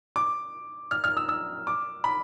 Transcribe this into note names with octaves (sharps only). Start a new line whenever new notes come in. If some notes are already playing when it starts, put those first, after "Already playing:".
D6
F6
F6
E6
E6
D6
B5